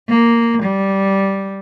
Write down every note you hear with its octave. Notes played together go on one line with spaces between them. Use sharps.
A#3
G3